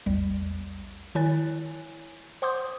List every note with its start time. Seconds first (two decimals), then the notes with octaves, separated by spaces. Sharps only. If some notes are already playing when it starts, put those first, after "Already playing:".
0.06 A#1 E2 G3
1.15 D#3 E4 C#5 G#5 F#6 A6
2.42 C5 F#5 C6 D6 D#6 G6